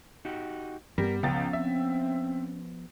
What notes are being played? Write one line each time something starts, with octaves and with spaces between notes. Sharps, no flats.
D#4 F#4 G4
G2 G3 B3 A#4
C#2 F3 B3 C#4 G5 A6
C4 E5